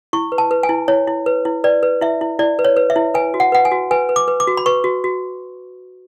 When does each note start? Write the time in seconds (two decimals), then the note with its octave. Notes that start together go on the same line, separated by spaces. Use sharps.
0.13 E4 C#6
0.32 B4
0.38 A5
0.51 B4
0.63 G#5
0.69 E4
0.88 E4 C#5
1.08 E4
1.26 B4
1.45 E4
1.64 B4 D5
1.83 B4
2.01 E4 E5
2.21 E4
2.39 E4 D5
2.59 B4
2.65 C#5
2.77 B4
2.90 E5
2.96 E4
3.14 B4 G#5
3.34 F#4
3.40 F#5
3.52 B4 F#5
3.65 G#5
3.72 F#4
3.91 B4 G#5
4.09 B4
4.16 D6
4.28 B4
4.40 D6
4.47 F#4
4.57 B5
4.66 B4 C#6
4.84 F#4
5.04 F#4